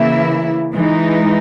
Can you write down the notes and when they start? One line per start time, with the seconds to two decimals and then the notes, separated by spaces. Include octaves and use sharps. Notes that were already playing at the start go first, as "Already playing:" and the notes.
Already playing: C#3 E3 A#3 E4 E5
0.74 E3 G#3 D#4